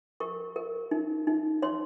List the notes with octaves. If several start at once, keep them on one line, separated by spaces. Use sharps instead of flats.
A#4 C#6
A#4
D#4
D#4
C#5 C6